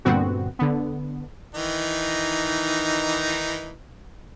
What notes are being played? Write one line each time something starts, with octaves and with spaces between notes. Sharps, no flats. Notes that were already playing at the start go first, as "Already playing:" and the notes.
G2 A#2 D3 B3 C4 F#4
D3 B3
D#3 E3 D#4